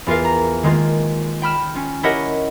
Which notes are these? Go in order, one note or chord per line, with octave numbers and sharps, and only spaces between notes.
E2 F4 A#4 F5
A#5
D#3 G#3 A#3 F4
G5 B5 F6 E7
C#4 F4
E4 G4 A#4 C#5 D#5 F#5